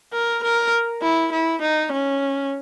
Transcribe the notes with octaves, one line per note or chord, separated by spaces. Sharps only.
A#4
A#4
E4
E4
D#4
C#4